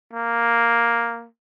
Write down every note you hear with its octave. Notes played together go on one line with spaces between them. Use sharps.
A#3